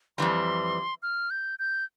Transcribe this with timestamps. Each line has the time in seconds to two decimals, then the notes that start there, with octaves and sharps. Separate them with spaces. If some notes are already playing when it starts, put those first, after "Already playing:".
0.18 F2 E3 G3 C6
1.03 F6
1.30 G6
1.59 G6